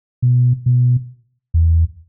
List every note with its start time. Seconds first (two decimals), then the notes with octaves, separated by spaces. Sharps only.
0.22 B2
0.66 B2
1.54 E2